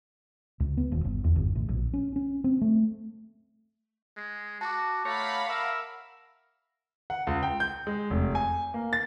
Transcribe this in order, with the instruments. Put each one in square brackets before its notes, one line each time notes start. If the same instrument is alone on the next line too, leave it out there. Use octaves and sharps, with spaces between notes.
[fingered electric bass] C#2
B3
D#1
G1
E2
G1
A1
A#1
C#4
C#4
C4
A3
[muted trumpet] G#3
[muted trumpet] F#4 [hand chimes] A5 D6
[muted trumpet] A3 [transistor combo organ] C#5 A#5 [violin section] F5 F#5 B5
[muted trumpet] A#4 [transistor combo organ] E5
[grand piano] F#5
C#2
G5
G6
G#3
F1
G#5
A#3
A6